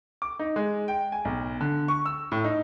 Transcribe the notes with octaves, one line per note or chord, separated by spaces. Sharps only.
D6
D#4
G#3
G5
G#5
B1
D3
C#6
E6
A2
D#4